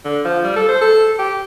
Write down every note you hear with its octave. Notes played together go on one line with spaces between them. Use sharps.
D3
F3
G3
A4
C5
A4
G4